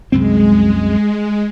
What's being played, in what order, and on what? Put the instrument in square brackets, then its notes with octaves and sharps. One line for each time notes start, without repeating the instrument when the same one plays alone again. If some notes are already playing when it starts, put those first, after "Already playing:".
[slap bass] C2 F#2 C4 [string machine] G#3